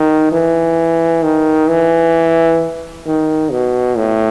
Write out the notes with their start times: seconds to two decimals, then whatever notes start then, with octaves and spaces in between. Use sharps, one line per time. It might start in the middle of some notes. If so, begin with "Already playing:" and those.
Already playing: D#3
0.32 E3
1.24 D#3
1.69 E3
3.06 D#3
3.51 B2
3.97 A2